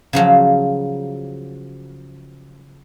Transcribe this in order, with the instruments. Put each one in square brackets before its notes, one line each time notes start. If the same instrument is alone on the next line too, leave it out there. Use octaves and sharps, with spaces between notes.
[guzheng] C#3 F3 F#3